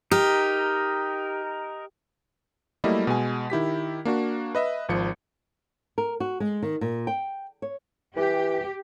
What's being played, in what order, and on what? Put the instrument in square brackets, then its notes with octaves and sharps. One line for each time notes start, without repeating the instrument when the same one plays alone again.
[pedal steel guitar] D#4 A#4 [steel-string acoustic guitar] G4
[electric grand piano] F#3 G3 A3 A#3 E4 D#5
B2 G#3 G#5
D#3 E4 G4 B6
A#3 D4 F#4
B4 D#5 E5
G#1 F3 C#7
[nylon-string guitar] A#4
F#4
G#3
D#3
A#2
G5
C#5
[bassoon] E3 [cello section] G4